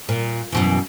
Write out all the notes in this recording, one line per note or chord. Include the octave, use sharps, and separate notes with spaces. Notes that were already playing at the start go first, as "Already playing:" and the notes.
A#2
F#2 B2 E3